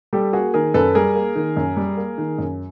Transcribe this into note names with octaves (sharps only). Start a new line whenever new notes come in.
G3 G4 A4
A#3 F#4 G#4
D#3 G#4 A#4
F#2 A4 B4
G3 G#4 A#4
A#3
D#3
F#2
G3
A#3
D#3
F#2